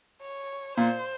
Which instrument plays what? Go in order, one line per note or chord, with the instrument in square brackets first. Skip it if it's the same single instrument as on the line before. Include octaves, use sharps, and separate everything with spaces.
[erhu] C#5
[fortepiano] A#2 [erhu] C5